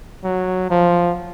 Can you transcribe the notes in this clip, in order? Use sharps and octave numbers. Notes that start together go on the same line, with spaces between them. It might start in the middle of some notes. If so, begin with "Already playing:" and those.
F#3
F3